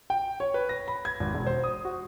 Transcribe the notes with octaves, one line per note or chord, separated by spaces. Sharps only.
G5
C#5
B4
A#6
B5
G#6
G#1
E1
C5
D#6
F#4